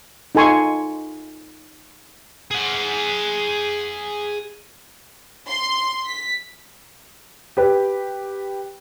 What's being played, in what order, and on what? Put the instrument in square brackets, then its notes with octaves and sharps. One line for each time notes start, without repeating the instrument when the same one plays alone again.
[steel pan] D#4 F4 A4 G#5 C6 C#6
[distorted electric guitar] G#4 F#5
[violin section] C6
B6
[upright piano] G4 B4